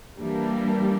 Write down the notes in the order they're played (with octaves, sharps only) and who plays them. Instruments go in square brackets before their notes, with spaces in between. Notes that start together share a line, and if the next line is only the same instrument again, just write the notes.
[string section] E3 G3 A#3 D4